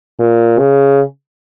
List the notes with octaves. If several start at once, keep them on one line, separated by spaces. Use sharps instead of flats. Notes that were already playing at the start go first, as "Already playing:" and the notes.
A#2
C#3